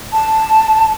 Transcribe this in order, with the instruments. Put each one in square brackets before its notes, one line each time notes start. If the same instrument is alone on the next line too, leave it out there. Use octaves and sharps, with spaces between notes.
[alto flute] A5